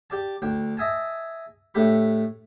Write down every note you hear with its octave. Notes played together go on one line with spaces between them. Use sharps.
G4 D5 A5
D2 D4 G5
D#5 E5 G#5 A5
A2 A3 D4 G4 B5